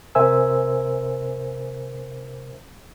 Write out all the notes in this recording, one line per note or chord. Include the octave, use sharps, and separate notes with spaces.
C3 A#4 C5 E5 G#5 E6